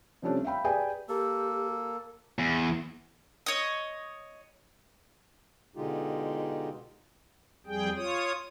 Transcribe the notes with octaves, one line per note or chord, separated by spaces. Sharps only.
C3 F3 G3 A3 C#4 D4
E5 F5 G5 B5
G4 G#4 B4 D5 G5 G#5
A#3 G4 A4
E2
C#5 D#5
B2 D3 G#3 D#4 F4 G4
F2 G3 G#4 G5
F4 C#5 D#6